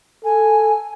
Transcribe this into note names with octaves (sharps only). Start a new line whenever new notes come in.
A4 G#5